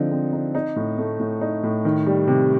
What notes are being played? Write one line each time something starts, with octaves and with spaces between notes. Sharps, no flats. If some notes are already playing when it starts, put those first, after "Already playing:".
Already playing: D3 F3 C4 D#4
C4
D#4
D#4
A2
A3
A2
D#4
A2
D#3
G3
C3